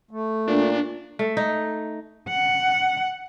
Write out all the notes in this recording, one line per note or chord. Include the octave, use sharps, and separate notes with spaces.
A3
A#2 D4
A3
D#4
F#5